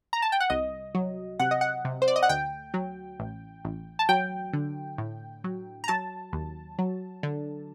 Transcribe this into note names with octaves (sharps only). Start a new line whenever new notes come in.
A#5
A5
G5
F#5
C2 D#5
F#3
C3 F#5
D#5
F#5
C3
C5
D5
D#5
F#5
D2 G5
F#3
A1
A1
A5
F#3 G5
D3
A2
F#3
A#5
F#3 A5
D#2
F#3
D3